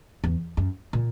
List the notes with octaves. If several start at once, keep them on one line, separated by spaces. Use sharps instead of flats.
E2
F#2
A#2